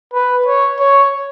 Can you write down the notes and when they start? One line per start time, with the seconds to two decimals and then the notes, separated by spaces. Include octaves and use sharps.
0.14 B4
0.46 C#5
0.79 C#5